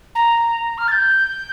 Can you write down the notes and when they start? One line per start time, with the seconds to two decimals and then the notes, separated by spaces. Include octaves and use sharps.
0.15 A#5
0.78 F6
0.88 A6
0.92 G6